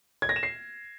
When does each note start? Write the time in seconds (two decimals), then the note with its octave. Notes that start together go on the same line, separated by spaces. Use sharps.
0.22 G#6
0.29 A#6
0.36 E7
0.43 C7